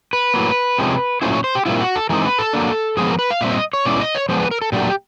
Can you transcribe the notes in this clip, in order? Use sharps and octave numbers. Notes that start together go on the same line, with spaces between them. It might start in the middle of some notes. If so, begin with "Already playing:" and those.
B4
A2 F#3 A#3
C3 F3 G#3 C#4
A#2 F#3 A3 C#4 E4 C5
C#5
C5
G4
A#2 G3 C4 E4 F4
F#4
A4
E3 G#3 C4 D#4 A#4
B4
A4
F#3 A#3 D4
A2 F3 G#3 B3 G#4
A#4
B4
F5
A#2 G3 C4 E5
D#5
C#5
B2 G#3 C#4 E4 D5
D#5
C#5
F3 G#3 B3 D4 C5
B4
A#4
A4
A#2 F#3 A3 D4 G4